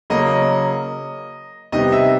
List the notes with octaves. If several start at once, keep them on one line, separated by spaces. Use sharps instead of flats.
C#3 F#3 A#3 D#5
C3 D#3 G3 B3 D#5
E5